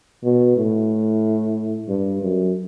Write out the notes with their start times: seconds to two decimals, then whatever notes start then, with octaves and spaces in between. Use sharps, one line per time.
0.24 B2
0.57 A2
1.88 G2
2.22 F#2